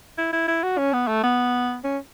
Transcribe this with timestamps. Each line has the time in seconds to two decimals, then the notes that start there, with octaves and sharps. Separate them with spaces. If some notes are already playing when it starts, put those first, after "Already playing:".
0.18 E4
0.33 E4
0.48 E4
0.64 F#4
0.78 C#4
0.93 B3
1.08 A3
1.24 B3
1.84 C#4